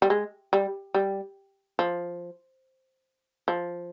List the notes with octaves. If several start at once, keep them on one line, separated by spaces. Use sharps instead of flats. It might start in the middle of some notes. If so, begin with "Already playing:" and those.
G3
G#3
G3
G3
F3
F3